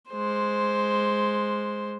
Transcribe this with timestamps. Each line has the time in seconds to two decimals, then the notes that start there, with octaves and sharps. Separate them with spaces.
0.10 G#3 C5